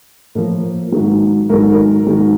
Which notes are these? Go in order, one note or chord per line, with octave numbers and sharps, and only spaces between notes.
A2 F3 A#3 A#4
G#2 D#3 F#3
G#2 D#3 F#3 A#4
A4
A#4
G#2 D#3 F#3